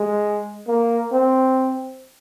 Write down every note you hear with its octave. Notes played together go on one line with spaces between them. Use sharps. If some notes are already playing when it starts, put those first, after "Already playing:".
Already playing: G#3
A#3
C4